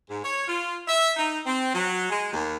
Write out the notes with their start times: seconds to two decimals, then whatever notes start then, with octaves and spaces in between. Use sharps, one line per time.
0.10 G#2
0.24 C#5
0.48 F4
0.87 E5
1.16 D#4
1.45 C4
1.74 F#3
2.10 G#3
2.32 D#2